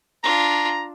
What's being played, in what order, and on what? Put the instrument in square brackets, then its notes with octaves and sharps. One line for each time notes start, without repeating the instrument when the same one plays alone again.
[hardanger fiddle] D4 F4 [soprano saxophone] A#5